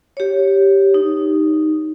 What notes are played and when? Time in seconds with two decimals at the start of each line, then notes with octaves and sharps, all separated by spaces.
0.17 G4 C#5
0.94 D#4